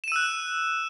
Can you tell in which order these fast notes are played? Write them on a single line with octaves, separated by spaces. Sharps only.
E7 D#7 E6 F#6